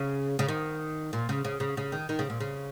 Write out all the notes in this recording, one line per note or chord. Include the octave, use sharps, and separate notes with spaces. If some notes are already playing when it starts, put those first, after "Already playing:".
Already playing: C#3
C#3
D#3
A#2
C#3
C#3
C#3
C#3
D#3
D#3
C#3
A#2
C#3